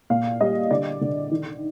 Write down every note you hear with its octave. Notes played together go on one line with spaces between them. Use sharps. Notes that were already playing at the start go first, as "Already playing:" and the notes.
A#2 F5
G3 D#5
D3 D5
D3
D#3